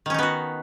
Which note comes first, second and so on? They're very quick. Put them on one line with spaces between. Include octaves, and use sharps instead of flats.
D#3 C#4 D#4 B3 F#4